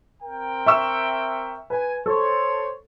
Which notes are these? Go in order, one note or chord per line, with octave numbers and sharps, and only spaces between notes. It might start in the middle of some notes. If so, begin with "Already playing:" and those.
C4 A#4 G5
E5 C#6 E6
B4 G#5
A4 C5 C#5